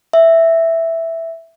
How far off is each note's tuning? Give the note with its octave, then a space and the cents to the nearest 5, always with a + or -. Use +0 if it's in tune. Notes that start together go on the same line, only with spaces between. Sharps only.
E5 +0